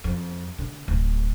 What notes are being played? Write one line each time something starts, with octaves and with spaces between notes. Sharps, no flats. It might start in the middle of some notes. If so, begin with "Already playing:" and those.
F2
D3
D1